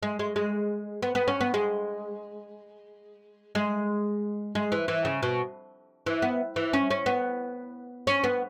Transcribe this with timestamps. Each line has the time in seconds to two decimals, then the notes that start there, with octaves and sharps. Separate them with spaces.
0.03 G#3
0.19 G#3
0.36 G#3
1.02 B3
1.15 B3
1.28 C#4
1.41 B3
1.54 G#3
3.55 G#3
4.55 G#3
4.72 E3
4.88 E3
5.05 C#3
5.23 B2
6.06 E3
6.22 B3
6.56 E3
6.73 C#4
6.90 C#4
7.06 B3
8.07 C#4
8.24 B3